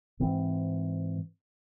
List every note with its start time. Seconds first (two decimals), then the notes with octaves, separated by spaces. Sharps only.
0.20 G#2 E3 C4